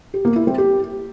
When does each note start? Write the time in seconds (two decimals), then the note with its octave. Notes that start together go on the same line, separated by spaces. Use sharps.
0.14 G4
0.25 A#3
0.36 E4
0.47 C4
0.58 G4